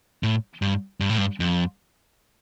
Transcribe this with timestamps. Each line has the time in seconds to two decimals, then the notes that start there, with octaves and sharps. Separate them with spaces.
0.23 A2
0.62 G2
1.00 G2
1.09 A2
1.18 G2
1.40 F2